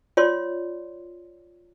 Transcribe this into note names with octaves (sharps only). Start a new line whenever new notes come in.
F4 C#5 D5 C6